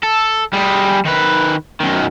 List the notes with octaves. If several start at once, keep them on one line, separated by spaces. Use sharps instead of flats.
A4
G3 G#4
D#3 B4
F#2 D#3